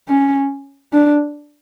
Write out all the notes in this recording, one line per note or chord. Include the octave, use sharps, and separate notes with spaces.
C#4
D4